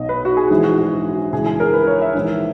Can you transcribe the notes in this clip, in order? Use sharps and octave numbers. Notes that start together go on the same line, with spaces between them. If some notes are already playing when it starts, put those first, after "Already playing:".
Already playing: B1 B2 D#5
B4
F#4
G#4
A#1 G#2 E3 G#4
F#4
F#4
C#2 C#3 E3 G#4
G#4
A#4
B4
C#5
E5
A#1 G#2 E3